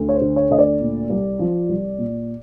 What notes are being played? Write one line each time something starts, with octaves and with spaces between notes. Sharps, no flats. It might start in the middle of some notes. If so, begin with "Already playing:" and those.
Already playing: D2
C#5
C5
D3
C#5
D2 D#5
D5
A#2
C2
F3
C2
A#2